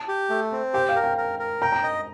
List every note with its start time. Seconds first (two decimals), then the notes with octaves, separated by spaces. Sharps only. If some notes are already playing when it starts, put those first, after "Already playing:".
Already playing: A5
0.08 G4
0.30 A3
0.52 C4
0.74 G4 G5
0.89 F5
0.96 A#4
1.04 G5
1.18 A#4
1.39 A#4
1.62 G5 A#5
1.72 A#5
1.84 D#5